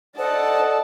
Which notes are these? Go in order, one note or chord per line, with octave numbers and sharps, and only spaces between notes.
A4 C5 D5 D#5 F#5 A5